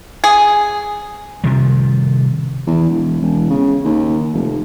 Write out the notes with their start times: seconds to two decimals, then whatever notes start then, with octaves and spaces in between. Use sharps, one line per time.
0.24 G#4
1.44 C3 D#3 F3 G3
2.67 E2
2.90 E1
3.22 E1
3.50 C#3
3.85 D#2
4.34 F1